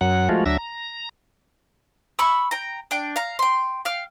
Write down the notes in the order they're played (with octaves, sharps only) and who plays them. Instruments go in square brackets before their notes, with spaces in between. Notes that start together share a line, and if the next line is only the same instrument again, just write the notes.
[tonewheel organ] F#2 F#3 F#5
F3 G#3 A3 F4 F#4
D2 F#3 D4 E5 E6 A#6
A#5
[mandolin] B5 C#6 E6
G5 A#5
D4 G5
F5 A#5
G5 C6
F5 G5 F6